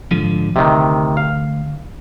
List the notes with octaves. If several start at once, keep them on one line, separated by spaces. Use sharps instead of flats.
G#2 D3 F3
D2 C3 D#3
F5